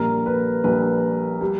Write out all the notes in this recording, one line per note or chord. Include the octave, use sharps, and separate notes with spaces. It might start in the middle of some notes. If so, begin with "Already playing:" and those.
Already playing: A#1 A#2 G3 A#4
B4
A#1 A#2 G3 B4
G3